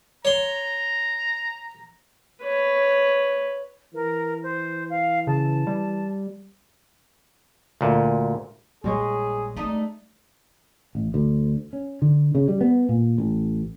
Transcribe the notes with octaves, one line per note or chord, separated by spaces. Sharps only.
C#5 A#5 C6
B4 C#5
E3 A#4
C5
F5
C#3 A5
G3
D2 A#2
A#1 G3 G#3 G#4 C#5
A3 C4 D4 D#4
A1
D2
C#4
D3
C#3
G3
B3
A#2
A1